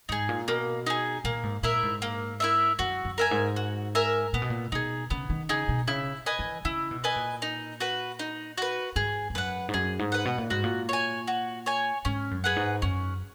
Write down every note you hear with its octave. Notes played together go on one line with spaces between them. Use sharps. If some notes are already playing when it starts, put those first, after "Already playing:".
G#2 D#4 G#4
A#2
B2 A#3
D#4 G#4
A#2 A#3
G#2
A#2 E4 A#4 E5
G#2
A#3
E4 A#4 E5
F#2 F#4
F#2
A#4 E5 G#5
G#2
F#4
A#4 E5 G#5
A#2 B3
B2
A#2
B2 D#4 G#4
C#3 B3
D#3
C#3 D#4 G#4
B2
C#3 E4
B4 D#5 G#5
E3
C#3 E4
B2
B4 D#5 G#5
A#2
D#4
F#4 B4
D#4
F#4 B4
G#2 G#4
G#2
F#2 B4 F#5
G#2
F#2 G#4
G#2
B4 F#5
B2
A#2
G#2 F#4
A#2
C#5 G#5
F#4
C#5 G#5
G#2 C#4
F#2
G#4 B4 F#5
G#2
F#2 C#4